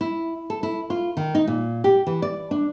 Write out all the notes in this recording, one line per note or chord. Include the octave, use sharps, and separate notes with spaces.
E4
A4
E4
F4
D#3
D#4
A#2
G4
E3
D5
D4